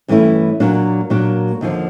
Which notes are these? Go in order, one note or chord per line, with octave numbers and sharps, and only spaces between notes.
G2 E3 A3 C#4 E4
A#2 F#3 A#3 D4
A#2 F#3 A#3 D4
D#2 D3 F3